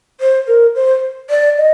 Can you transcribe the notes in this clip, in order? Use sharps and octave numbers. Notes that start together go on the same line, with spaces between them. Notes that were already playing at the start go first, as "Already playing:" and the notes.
C5
A#4
C5
D5
D#5